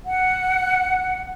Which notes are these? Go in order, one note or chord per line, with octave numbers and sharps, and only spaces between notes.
F#5